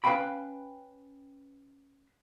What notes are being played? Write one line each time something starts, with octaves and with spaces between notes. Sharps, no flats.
C#4 B4 C5 F5 G5 B5